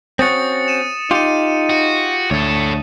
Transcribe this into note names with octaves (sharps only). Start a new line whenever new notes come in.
C4 C#4 F#4 D#6 A6 C#7
D#7 E7
D#4 F4 G4 C#7 D#7
F#4
D2 A4 C#5